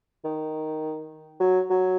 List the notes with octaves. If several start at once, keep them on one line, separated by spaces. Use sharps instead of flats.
D#3
F#3
F#3